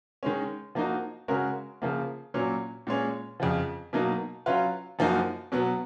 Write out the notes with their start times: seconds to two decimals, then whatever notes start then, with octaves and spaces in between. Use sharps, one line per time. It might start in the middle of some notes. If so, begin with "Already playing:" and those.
0.23 D#3 G#3 C#4
0.75 F3 A#3 D#4 F#4
1.28 C#3 G#3 C#4 F#4 A#4
1.82 C#3 F3 A#3
2.34 A#2 F#3 C#4
2.87 A#2 G#3 C#4
3.40 F2 C#3 F3
3.93 B2 F#3 A#3 D#4
4.46 F#3 C#4 F4 B4
4.99 F#2 F3 A#3 D#4 F#4
5.52 B2 F#3 B3